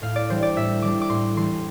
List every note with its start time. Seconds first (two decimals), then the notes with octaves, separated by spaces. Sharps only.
0.02 A2 F5
0.16 D5
0.30 E3 G3 D4 C5
0.43 D5
0.56 A2 E5
0.82 E3 G3 D4 D6
1.02 D6
1.09 A2 C6
1.37 E3 G3 D4 C6